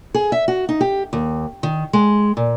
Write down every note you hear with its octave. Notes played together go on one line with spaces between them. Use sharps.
G#4
E5
F#4
D#4
G4
D#2
D#3
G#3
A#2